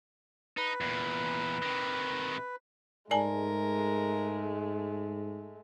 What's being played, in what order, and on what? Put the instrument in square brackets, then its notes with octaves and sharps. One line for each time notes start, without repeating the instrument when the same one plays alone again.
[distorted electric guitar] D#4 [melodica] B4
[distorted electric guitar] E2 A#2
C3 D#3
[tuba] G#2 [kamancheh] G#3 A3 [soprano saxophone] A#4 [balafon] D5 G#5 A5